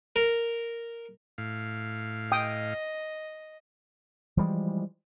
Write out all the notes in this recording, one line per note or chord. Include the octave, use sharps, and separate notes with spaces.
A#4
A2 F5
D#5 G5 D#6
E3 F3 G3 G#3